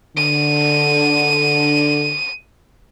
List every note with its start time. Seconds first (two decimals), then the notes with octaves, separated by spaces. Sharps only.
0.17 D3 D#7